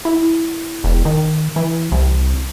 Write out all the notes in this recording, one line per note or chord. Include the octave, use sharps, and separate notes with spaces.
E4
E1
D#3
E3
C2